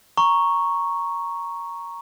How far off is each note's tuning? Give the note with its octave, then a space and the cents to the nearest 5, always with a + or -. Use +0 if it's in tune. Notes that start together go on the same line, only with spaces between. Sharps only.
A#5 +0 C#6 +0